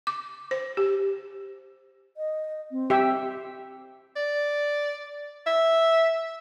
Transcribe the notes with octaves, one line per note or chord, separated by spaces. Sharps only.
D6
C5
G4
D#5
C4
G4 E5
D5
E5